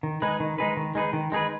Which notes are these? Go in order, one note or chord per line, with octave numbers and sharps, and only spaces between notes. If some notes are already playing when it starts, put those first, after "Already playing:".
D#3
G#3 D#4 G#4 B4
D#3
G#3 D#4 G#4 B4
D#3
G#3 D#4 G#4 B4
D#3
G#3 D#4 G#4 B4